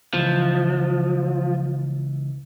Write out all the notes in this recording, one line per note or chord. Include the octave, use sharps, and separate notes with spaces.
C#2 E3 F3